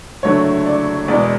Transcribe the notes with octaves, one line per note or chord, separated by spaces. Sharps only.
F#1 F#2 D3 A3 D4 C#5
D5
E1 E2 B2 G#3 D5